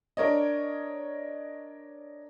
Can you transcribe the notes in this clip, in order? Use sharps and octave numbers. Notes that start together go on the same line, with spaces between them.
D4 A#4 C#5 D#5